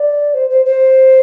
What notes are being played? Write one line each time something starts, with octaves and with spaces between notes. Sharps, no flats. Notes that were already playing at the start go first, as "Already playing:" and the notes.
Already playing: D5
C5
C5
C5